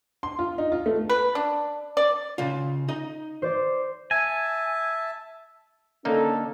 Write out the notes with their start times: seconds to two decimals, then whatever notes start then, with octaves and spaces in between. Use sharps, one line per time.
0.23 C6
0.39 F4
0.58 D#4
0.72 F4
0.86 A3
1.09 B4
1.35 D4
1.97 D5
2.38 C#3 F4
2.88 D#4 D#5
3.42 C5 D5
4.11 E5 G#5 A5
6.05 D3 A#3 C#4 D#4 A4